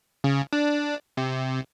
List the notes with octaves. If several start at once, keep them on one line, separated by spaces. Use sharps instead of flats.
C#3
D4
C3